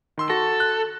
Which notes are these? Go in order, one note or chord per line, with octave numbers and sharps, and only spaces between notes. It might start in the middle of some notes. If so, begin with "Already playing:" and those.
D#3 C6 E6
F#4 A4 A#6
F#6